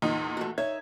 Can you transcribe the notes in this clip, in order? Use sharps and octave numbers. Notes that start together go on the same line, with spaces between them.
E2 A#2 D#4
A3 F#4
D#4 C#5 E5 G#6